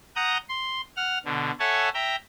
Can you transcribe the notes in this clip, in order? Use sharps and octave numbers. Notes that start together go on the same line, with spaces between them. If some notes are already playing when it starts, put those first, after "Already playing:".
F#5 A#5 D#6 G6
C6
F#5 F6
B2 D3
A4 C#5 E5 F#5 G#5 A5
E5 G5 A#5